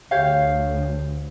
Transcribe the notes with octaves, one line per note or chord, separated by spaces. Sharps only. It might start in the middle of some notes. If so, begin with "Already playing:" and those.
D2 G4 C#5 F5